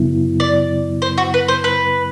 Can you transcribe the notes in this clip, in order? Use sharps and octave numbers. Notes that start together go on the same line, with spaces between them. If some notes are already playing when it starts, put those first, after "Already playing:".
Already playing: F#2 C#3 F#3 B3 E4
D5
C5
F#4
B4
C5
B4